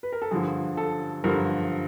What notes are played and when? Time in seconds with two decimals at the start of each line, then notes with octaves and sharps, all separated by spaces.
0.03 B4
0.13 A#4
0.22 A4
0.31 G2 D3 F3 G#4
0.77 A4
1.24 G2 D3 F3 A#4